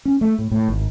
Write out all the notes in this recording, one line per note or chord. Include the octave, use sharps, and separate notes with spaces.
C#4
A3
A2
A2
G#1